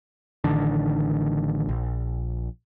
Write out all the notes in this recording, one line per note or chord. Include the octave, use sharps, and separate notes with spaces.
A1 D3 D#3 D4
A#1